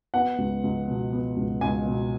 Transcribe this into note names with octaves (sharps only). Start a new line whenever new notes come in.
B3 F#5
C#2
C#2
B2
B3
C#2
C#2 G#5
B2